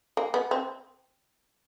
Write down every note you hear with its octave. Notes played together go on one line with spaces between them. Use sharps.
A#3
B3
C4